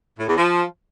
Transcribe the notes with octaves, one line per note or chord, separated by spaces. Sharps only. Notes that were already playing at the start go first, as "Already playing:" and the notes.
A2
E2
F3